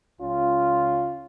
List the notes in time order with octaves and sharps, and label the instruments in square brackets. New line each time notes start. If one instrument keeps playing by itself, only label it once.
[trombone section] C#2 C#4 F4